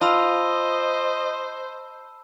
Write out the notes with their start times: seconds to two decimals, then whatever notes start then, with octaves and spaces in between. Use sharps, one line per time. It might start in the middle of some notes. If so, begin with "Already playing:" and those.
0.01 F4 C5 D#5 A5 B5 E6